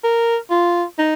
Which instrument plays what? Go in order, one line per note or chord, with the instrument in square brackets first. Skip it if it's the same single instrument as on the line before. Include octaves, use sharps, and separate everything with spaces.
[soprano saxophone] A#4
F4
D#4